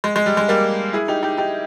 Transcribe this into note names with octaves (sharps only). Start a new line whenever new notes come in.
G#3
G#3
G3
G#3
G3 A#3
E4 G#4
D#4 G4
D#4 G4
D#4 G4